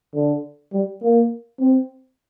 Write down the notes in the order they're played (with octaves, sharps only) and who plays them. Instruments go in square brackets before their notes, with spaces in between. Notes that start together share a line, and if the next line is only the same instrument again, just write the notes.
[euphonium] D3
G3
A#3
C4